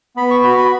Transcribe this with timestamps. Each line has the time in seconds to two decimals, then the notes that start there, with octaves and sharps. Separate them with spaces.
0.16 B3 B5
0.31 C#6
0.44 F#4 B5
0.58 B5